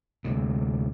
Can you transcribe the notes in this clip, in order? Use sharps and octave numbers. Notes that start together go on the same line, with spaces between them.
D2 C3